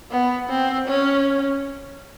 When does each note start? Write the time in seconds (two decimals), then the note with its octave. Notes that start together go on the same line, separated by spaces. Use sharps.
0.11 B3
0.50 C4
0.88 C#4